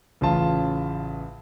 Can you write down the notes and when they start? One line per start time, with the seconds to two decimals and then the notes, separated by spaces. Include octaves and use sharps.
0.21 A1 C#3 F4 A5